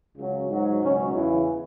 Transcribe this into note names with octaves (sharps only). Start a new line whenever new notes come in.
C#2 C#3 F#3
G#2 F#3
C#2 B2 F#3 C#4
E2 C#3 E3